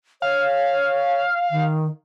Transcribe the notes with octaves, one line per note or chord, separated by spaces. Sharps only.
C#5 F5
D#3